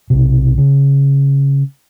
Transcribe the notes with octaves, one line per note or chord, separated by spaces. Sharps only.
B1 C3
C#3